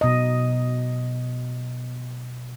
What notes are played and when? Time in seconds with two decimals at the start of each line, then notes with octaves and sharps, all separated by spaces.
0.01 B2 D#5